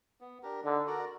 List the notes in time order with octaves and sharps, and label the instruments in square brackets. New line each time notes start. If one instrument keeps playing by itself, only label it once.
[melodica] B3
D4 G4 A#4
[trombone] D3 [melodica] D#4
[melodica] F#4 A#4 D5